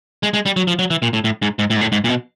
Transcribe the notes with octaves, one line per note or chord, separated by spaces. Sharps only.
G#3
G#3
G3
F#3
F3
F#3
E3
A#2
A2
A2
G#2
G#2
A2
G#2
A2
G#2
A#2
B2